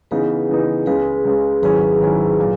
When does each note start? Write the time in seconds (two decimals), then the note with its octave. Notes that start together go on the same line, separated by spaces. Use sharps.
0.11 C#3 E3 B3 D#4 G#4 B4
0.49 C#3 E3 B3 D#4
0.86 C#2 C#3 G#3 G#4 B4
1.25 C#2 C#3 G#3
1.62 G#1 G#2 F#3 C#4 E4 G#4 B4
2.00 G#1 G#2 F#3 C#4 E4
2.40 A#2 F#3